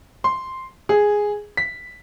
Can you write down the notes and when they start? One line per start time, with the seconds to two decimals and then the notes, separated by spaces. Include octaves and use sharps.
0.24 C6
0.89 G#4
1.57 B6